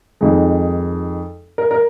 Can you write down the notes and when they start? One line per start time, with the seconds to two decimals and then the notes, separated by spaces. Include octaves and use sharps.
0.21 F2 D#3 G#3 D#4
1.58 A#4
1.71 A#4